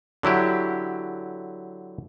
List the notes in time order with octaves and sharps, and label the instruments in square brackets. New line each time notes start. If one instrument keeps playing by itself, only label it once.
[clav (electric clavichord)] D3 F#3 E4 G4